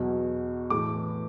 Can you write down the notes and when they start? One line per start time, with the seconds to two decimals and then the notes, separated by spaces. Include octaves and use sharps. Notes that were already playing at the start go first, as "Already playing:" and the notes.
Already playing: E2 B2 F#3
0.70 A2 E3 D6